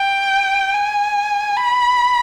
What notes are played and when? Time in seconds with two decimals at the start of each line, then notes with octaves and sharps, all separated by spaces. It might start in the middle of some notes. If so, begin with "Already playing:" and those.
Already playing: G5
0.74 G#5
1.57 B5